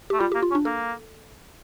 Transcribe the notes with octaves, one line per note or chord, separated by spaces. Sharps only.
A3 G4
G3 F4
A#3 G4
F4
C#4
D4
A#3 A4